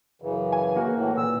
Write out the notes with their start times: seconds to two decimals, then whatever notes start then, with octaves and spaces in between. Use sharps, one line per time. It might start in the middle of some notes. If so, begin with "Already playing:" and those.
0.22 F#2 C#3 E3
0.52 G#5
0.76 A#3 F#4
0.94 A2 E3
1.17 A#2 E6